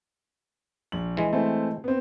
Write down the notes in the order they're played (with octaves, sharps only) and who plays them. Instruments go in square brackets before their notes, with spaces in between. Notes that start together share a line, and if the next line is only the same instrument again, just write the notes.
[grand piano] A#1 F#7
[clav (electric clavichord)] E3 G#3
[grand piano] A3 C4 E4
B3 C4